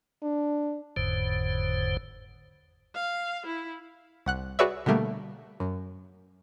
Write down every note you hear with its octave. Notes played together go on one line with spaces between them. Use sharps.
D4
F#1 E2 G#2 D3 C5
F5
E4
C2 F#5 F#6
F#4 G#4 B4 C#5 D5 E5
B2 D3 G3 A3 A#3
F#2